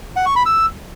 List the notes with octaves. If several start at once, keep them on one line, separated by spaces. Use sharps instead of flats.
F#5
C#6
B5
E6